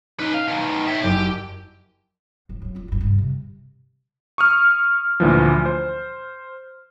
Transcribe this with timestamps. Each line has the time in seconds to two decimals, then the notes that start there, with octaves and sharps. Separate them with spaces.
0.20 C#4 D#4 B4
0.34 F5
0.48 B2 D#3
0.88 C#5 E5
1.04 F#1 G4 D#7
2.49 G#2 F3
2.62 G2 F#3
2.75 C4 F4
2.88 G2 F4
3.01 G2 C3
3.18 C3
4.38 C#6 D#6 F6
5.20 D2 A#2 E3 F3
5.66 C5